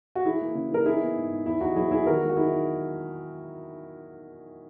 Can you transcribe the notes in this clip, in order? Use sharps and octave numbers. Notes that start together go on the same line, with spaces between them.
F#4
E3 E4 G#4
A#3
C#3
E3 A#4
D#4 E4 G#4
B3
G#2
G#2
E2 E4
E2 D#4 F#4
F#3 E4 G#4
E2 E4 G#4
D#3 F#4 A#4
G#3
F#4
D#4 E4 G#4